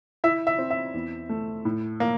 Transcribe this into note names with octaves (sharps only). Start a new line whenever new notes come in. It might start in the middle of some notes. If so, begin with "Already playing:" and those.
E4 E5
E5
C4
E5
E2
A3
A2
A#3